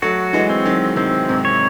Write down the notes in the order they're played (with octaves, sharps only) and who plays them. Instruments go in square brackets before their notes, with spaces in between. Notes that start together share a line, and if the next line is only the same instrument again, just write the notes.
[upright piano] F#3 A3 [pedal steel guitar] F#4
[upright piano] E3 G#3
[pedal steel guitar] C4
[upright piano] D#3 F#3
[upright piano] C3 D#3 [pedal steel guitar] C4
[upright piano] G#2 C3
[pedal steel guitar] C#5